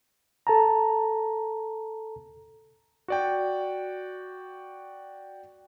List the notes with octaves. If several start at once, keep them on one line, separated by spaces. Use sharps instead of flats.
A4 A5 A#5
F#4 D5 G5